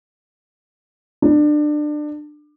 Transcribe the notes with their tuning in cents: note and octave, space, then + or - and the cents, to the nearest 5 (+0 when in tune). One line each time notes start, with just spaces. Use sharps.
D4 +25